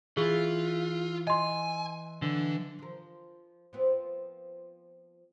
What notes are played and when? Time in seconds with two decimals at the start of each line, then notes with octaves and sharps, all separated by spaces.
0.17 E3 F4 G#4
1.27 D#5 G#5 C6
2.22 D3 E3
2.79 F3 A#4
3.73 F3 B3 C4